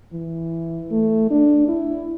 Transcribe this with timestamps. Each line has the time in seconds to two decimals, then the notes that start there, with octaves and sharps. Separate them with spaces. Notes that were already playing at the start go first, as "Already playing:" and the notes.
0.13 E3
0.91 A3
1.31 D4
1.68 E4